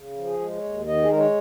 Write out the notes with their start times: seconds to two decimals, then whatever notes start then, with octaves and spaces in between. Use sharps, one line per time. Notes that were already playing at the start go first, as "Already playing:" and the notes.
Already playing: C#3
0.17 F3
0.24 G#4
0.40 G#3
0.56 C#5
0.63 D#2
0.87 D#3 D#5
1.02 G#4
1.10 G#3 A#4
1.18 C#5